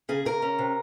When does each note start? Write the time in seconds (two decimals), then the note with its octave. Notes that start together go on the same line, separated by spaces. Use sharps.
0.09 C#3 G#4
0.25 C#3 A#4
0.42 C#4
0.58 C3